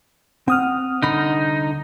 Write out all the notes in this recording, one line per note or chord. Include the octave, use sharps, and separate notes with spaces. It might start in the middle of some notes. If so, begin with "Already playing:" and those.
C4 F#5 D#6 F6
C2 D3 D#4 B5